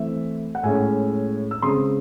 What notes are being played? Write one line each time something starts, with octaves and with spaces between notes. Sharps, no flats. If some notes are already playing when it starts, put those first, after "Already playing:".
Already playing: E3 A3 C4 E5
F#5
A2 G#3 C#4 E5 G#5
E6
C#3 G#3 C4 C6 D#6